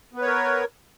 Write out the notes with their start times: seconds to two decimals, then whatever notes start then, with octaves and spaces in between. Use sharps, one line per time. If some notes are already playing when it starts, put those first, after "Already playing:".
0.13 B3
0.17 B4
0.22 C#5
0.26 A#4